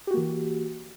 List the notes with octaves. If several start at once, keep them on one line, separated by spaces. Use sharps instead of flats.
E3 A#3 F#4 G4